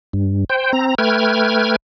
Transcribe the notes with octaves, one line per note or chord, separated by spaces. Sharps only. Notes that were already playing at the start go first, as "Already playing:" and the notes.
G2
C5 G5
C4 A#5
A3 B4 G5 F6 G#6